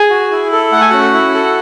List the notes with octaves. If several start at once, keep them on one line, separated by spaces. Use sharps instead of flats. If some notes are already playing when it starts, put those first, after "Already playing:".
Already playing: G#4 G#5
F#4
E4
A4
A3 F#5
G#5
C#4 F#4 F#5
E4
A4